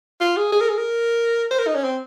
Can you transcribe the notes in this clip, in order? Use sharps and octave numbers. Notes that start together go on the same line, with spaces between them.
F4
G#4
G#4
A#4
G#4
A#4
C5
A#4
D#4
C#4
C4